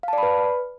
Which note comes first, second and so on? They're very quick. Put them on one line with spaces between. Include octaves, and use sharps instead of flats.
F5 A5 D5 B5 B4